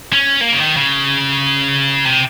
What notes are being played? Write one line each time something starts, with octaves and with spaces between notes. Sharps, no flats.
C#4
A#3
C#3
D#3
C#3
C3